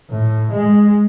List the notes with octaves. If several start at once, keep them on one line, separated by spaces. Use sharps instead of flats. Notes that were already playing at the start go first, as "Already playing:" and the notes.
A2
G#3